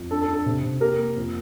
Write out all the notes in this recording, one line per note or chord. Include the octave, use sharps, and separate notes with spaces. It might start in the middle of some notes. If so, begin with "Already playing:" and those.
Already playing: F2
D4 A4
A4
D4
A4
C3
C3
A#3 G4 A#4
A#3
F2